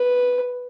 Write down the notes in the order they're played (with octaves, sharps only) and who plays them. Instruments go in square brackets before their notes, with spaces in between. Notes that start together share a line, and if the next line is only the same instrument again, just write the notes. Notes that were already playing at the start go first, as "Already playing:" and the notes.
Already playing: [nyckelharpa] B4